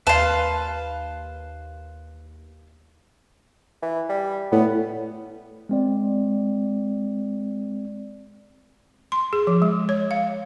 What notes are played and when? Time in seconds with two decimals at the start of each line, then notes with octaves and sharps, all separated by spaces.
0.07 D#2 B4 F5 A5 C6
3.82 E3
4.09 G3
4.52 A2 B3
5.69 G#3 C4 D5
9.12 C6
9.33 G#4
9.47 F3
9.62 G#3
9.89 C#5
10.11 F5